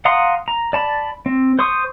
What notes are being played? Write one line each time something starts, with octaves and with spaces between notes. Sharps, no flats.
F5 F#5 A#5 C6 D#6
A#5
D5 A5 B5
C4
C5 C6 C#6 D#6